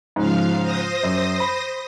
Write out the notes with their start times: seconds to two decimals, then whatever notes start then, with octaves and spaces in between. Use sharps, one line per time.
0.16 G#2 C#3 F3 F5
0.62 C5 D#6 A#6
1.03 F#2
1.40 B5